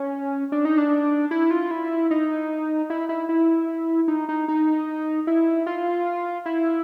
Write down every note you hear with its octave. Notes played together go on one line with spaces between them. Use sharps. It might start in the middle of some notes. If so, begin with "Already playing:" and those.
Already playing: C#4
D4
D#4
D4
E4
F4
E4
D#4
E4
E4
E4
D#4
D#4
D#4
E4
F4
E4